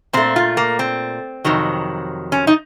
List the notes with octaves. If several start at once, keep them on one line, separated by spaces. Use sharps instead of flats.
A#2 A3 C4
F4
A#3
C4
F2 C3 D#3 F#3
C#4
D#4